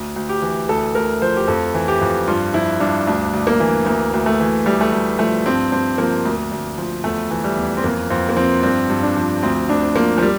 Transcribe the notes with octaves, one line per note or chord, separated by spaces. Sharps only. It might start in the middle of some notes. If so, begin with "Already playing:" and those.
Already playing: D2
D2
G4
E3
D2 A4
D2 A#4
F3 C5
G4
F2 A4
E3
G4
F2
G2 F4
F3 E4
G2 D4
D2 D4
D2
A#3
E3
D2 A#3
D2
A3
E3
D2 G3
A3
D2 G3
F3 A3
G2 C4
G2 C4
F3 A#3
D2
D2
F3
E2 A3
E3
G3
E2
C4
F2 A#3
F2 C4
A#3
F3 C4
G2 C4
G2
D4
F3
D2 C4
D2 D4
F3 A#3
F3
G3